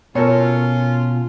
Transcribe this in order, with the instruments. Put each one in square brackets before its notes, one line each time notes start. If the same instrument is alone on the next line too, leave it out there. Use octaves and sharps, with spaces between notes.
[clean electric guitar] B2 [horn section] C#4 F4 [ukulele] A4 A#4 C#5